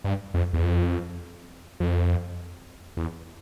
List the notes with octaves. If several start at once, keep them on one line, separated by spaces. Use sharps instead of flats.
G2
F2
E2
F2
F2
E2